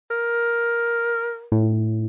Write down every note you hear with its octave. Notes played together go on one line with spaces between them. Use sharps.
A#4
A2